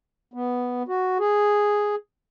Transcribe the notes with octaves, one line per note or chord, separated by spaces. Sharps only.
B3
F#4
G#4